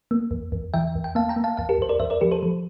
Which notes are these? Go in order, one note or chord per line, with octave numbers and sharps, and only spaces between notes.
A#3
E2
E2
E3 E5 G5
E2
G5
A#3 F5 A5
G5 A#5
A#3
F5 A5
E2 F5 A5
G4 A#4
E2 C5
A#4 D5
E2 C5 E5
A#4 D5
F3 G4 A#4
A4 C5
F3